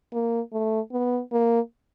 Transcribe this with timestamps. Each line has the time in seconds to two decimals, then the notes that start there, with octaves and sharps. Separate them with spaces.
0.13 A#3
0.52 A3
0.92 B3
1.32 A#3